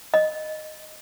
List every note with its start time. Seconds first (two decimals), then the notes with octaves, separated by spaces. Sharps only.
0.14 D#5